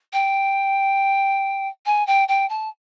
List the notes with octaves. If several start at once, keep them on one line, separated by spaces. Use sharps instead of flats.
G5
G#5
G5
G5
A5